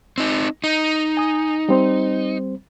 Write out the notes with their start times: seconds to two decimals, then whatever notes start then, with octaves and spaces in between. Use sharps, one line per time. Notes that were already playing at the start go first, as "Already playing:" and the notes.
0.18 C4 D#4
0.64 D#4
1.17 G#5 D#6
1.69 G3 C4 C5